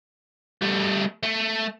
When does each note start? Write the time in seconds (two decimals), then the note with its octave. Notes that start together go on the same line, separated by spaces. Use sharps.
0.62 G3 A3
1.23 A3